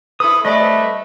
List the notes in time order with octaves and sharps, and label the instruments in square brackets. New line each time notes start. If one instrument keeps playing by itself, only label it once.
[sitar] E4 A4 B4 [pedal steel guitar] D#6
[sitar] G3 C4 D5 [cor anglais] A3 [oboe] B4 [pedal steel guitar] D#5